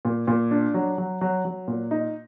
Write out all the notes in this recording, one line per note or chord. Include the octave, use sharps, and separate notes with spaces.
A#2
A#2
D4
F#3
F#3
F#3
F#3
A#2
D#4